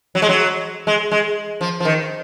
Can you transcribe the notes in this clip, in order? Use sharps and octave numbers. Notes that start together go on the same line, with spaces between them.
F#3
G#3
F#3
G#3
G#3
F3
F3
D#3